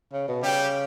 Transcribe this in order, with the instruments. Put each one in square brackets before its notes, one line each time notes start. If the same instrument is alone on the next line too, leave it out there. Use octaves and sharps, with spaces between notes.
[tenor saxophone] C#3
B2
[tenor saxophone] C#3 [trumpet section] G3 G4